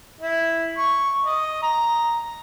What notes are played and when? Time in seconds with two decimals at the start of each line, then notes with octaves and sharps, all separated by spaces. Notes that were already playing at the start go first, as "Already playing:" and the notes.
0.21 E4
0.77 C#6
1.26 D#5
1.63 A#5